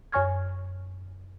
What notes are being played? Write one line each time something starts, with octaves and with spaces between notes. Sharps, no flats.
F#2 C#5 G#5 C#6 F6 G#6